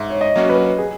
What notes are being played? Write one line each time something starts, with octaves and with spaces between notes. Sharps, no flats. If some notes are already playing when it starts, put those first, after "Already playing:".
Already playing: G#2 E5
C#5
D#5
F#3 A#3 C#4 F#4
B4
G#4